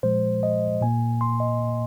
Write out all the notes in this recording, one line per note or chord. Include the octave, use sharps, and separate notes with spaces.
A#2 F3 G#3 C5
D#5
A#2 A#3 G#5
C6
D#5